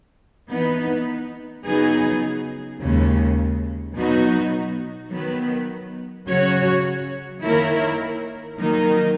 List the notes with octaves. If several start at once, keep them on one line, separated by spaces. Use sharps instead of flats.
E3 B3 D#4
C#3 F#3 B3 D#4 G#4
D#2 C#3 G#3
B2 F#3 B3 D#4 F#4
D#3 F#3 B3
C#3 F#3 C#4 F#4 C#5
D#3 A#3 E4 A#4 C#5
D#3 F#3 A#3 D#4 A#4